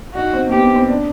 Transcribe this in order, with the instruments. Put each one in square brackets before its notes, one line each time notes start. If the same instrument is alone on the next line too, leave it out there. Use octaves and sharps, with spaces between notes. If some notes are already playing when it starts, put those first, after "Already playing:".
[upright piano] D#4 [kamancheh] F#4
[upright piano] C4
A#3
[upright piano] B3 [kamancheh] G4
[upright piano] A#3
C4
D4